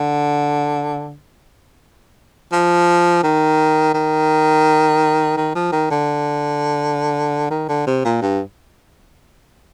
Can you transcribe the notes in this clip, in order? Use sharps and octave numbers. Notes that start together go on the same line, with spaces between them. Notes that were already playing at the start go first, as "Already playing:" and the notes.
Already playing: D3
F3
D#3
D#3
D#3
F3
D#3
D3
D#3
D3
C3
A#2
G2